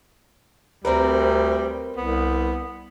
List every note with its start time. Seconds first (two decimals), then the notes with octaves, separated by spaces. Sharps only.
0.85 D2 G3 C4 A#4 B4
1.97 C2 B3